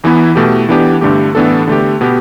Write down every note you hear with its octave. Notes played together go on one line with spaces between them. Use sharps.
E2 E3 B3 E4
B2 A3 G4
E3 B3 D4 G4
G2 D3 A3 G4
A2 E3 B3 D4 A4
D3 A3 G4
B2 B3 G4